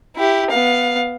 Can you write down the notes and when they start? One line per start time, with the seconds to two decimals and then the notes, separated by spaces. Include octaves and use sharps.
0.16 E4 G4
0.50 B3 F5